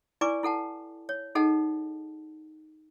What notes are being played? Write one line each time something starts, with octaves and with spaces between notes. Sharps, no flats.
E4 B4 D5 G#5 C#6 D6
E4 A4 F#5 A5
C#5
D#4 G#4 A4 D#5 F#5 A5